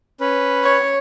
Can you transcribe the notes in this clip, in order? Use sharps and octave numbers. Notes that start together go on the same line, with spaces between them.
C#4 B4
C#5